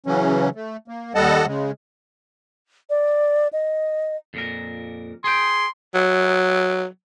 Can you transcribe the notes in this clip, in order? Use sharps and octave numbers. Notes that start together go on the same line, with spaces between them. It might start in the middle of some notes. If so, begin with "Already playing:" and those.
C#3 E3 F#3 C#4
A3
A#3
D#2 G3 A4 D#5 F#5 A5
C#3 G#3
D5
D#5
F2 A#2 A#4
G#4 G5 C6
F#3